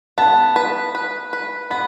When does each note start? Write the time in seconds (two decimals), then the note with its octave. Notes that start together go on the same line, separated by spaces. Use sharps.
0.18 B3 A5
0.56 B4
0.95 B4
1.33 B4
1.70 B3 B5